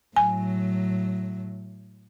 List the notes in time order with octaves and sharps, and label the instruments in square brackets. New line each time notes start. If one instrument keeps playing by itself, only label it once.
[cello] A2 F#3 [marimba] G#5